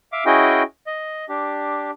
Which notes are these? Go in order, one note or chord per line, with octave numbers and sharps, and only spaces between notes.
E5 F5 D6
C#4 E4 F#4 G#4 D#5 G5
D#5
D4 G4